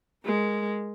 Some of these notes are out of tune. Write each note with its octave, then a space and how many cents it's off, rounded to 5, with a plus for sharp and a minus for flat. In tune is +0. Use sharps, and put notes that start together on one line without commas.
G#3 +0 A#4 +0